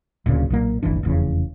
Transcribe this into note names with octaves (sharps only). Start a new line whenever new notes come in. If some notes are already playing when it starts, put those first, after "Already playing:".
D1 D2 A#2 C#3
B1 A#2 A#3
D1 G1 E3 D4
F1 E2 C#3